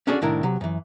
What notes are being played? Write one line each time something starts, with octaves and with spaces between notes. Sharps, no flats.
C#4 D4 F#4 G#4 A4 D5
C2 A2 D#3 D4 E4 A#4
C3 F#3
F#2 E3